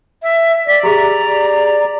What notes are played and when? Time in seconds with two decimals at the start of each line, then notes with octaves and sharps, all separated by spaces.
0.23 E5
0.68 D5 B6
0.83 G4 G#4 A#5